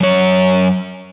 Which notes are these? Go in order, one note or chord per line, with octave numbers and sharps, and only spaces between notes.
F#2 C#5